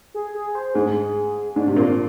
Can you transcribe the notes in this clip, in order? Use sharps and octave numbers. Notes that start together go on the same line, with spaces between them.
G#4
G#4
C5
G#2 G#4
G#2 D4
C3
A#2 C4